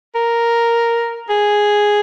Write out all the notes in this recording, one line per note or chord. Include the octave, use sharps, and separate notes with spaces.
A#4
G#4